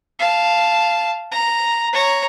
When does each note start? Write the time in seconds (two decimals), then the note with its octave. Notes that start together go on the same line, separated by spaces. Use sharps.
0.19 F5 A5
1.32 A#5
1.93 C#5 A#5